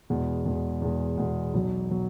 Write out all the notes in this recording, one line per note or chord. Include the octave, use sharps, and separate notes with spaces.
E2 B2 G#3
E2 B2 G#3
E2 B2 G#3
E2 B2 G#3
B1 B2 F#3
B2 F#3